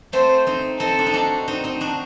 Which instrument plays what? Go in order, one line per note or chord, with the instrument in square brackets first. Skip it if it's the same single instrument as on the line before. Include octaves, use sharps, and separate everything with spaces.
[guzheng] A3 C4 [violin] C5
[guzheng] C4 D#4
[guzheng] C4 D#4 [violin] A4
[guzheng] D4
D#4
D4 F#4
C4 D#4
C4 D#4
D4 F#4